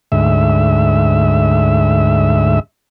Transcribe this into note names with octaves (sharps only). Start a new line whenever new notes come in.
D2 G#2 E5